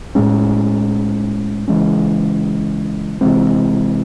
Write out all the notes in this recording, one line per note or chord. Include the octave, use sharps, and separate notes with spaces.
A2 G#3 C#4
C#3 E3 G#3 C#4
C3 E3 G#3 C4